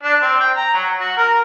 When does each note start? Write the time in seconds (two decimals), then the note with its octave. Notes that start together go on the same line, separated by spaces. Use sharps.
0.03 D4
0.22 C4
0.40 G5
0.56 A#5
0.74 F#3
1.00 F#4
1.17 A#4